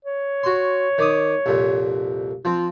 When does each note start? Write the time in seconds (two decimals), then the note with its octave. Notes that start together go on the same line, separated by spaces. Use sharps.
0.05 C#5
0.43 F#4 C6
0.98 D#3 D6 D#6
1.46 C2 F2 A#2
2.45 F3 C4 F4